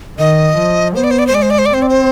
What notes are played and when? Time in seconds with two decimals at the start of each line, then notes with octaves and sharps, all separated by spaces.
0.18 D#3 D#5
0.57 F3
0.95 B3 C5
1.04 D5
1.11 C5
1.19 D5
1.27 C5
1.34 G#3 D5
1.42 C5
1.50 D5
1.59 C5
1.66 D5
1.73 C4 C5
1.82 D5
1.89 C5